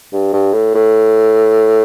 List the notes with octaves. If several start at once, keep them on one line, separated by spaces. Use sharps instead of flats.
G2
G2
A2
A2